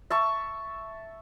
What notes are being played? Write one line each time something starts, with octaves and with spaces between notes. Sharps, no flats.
E5 A5 C#6